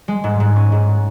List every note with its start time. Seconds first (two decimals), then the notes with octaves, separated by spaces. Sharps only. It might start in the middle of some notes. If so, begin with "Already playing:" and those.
0.08 G#3
0.24 G#2
0.40 G#2
0.56 C#4
0.72 G#2